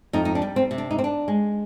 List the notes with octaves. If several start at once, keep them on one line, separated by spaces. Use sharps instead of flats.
F2 D#4
D#4
D4
G3
C4
C3
D4
D#4
C4
D4
G#3